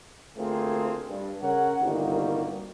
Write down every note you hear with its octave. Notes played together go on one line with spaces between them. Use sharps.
D2 A3 A#3 C4 F4 G#4
G2
C#3 A#4 C#5 F#5
G1 C2 D#3 G3 A#3 F#4